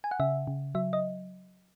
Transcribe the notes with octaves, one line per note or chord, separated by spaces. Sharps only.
G#5
F#5
C#3 E5
C#3
F#3 E5
D#5